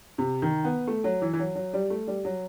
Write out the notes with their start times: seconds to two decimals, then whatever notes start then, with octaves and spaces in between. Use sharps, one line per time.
0.18 C3
0.42 D#3
0.64 B3
0.87 A3
1.04 F#3
1.22 E3
1.33 E3
1.39 F#3
1.55 F#3
1.74 G3
1.90 A3
2.07 G3
2.25 F#3